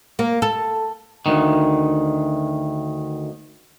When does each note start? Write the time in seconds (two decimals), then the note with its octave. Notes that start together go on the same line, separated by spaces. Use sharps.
0.19 A#3
0.42 A4
1.26 D2 D#3